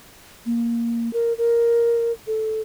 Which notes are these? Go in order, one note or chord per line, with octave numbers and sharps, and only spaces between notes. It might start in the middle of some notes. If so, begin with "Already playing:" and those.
A#3
A#4
A#4
A4